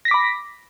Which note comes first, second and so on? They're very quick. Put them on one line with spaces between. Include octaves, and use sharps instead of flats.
A#6 B6 D6 B5